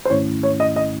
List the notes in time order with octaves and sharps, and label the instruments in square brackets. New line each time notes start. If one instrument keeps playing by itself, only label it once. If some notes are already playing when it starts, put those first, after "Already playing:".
[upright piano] C5
[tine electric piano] G#2 D#3 A3 C#4 E4 [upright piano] C#5
[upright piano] C#5
D#5
D#5